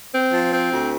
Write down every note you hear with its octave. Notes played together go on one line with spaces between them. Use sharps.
C4
F3
C4
D2